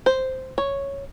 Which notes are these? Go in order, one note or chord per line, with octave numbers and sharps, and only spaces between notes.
C5
C#5